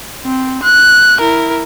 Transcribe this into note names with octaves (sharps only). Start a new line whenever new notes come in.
C4
F#6
E4 A#4